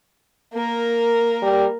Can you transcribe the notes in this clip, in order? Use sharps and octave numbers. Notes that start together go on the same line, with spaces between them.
A#3 A#4
G3